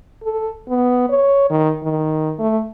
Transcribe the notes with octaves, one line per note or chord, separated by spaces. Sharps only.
A4
B3
C#5
D#3
D#3
A3